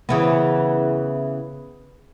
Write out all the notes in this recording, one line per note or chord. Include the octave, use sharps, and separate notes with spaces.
C#3 E3 B3